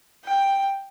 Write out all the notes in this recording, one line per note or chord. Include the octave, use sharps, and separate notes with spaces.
G5